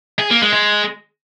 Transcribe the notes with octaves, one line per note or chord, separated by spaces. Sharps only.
G#4
A#3
G#3
G#3